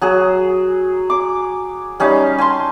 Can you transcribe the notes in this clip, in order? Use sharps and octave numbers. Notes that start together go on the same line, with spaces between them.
F#3 G#4
D6
G3 C#4 D#4 F5
G#5 A5 C6